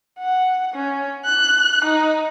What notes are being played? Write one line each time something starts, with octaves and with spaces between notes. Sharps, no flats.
F#5
C#4
F#6
D#4